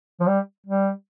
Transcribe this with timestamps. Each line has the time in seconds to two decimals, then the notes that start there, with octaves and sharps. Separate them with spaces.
0.21 F3
0.27 G3
0.67 G3